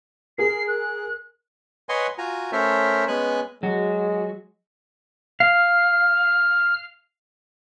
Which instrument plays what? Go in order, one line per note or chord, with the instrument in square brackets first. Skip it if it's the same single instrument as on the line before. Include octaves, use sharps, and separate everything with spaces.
[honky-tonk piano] G#4 A#4 [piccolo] C7
[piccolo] F#6
[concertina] B4 C#5 D#5 F#5 G#5 C6
F4 F#4 G#5 A#5
A3 C#4 A#4 C5 C#5 E5
G#3 B3 C#4 G#5 F#6
[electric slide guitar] F#3 F#4 [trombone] G#3
[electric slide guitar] F5 [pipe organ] F6